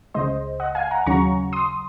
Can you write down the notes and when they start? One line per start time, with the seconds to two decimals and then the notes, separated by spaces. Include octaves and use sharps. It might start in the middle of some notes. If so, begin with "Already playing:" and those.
0.14 C#2 C#3 G#3 C5 D#5
0.60 D#5 F#5
0.75 F5 G#5
0.91 F#5 A#5
1.06 D#2 C#3 F#3 C#4 A#5 C#6
1.52 C6 D#6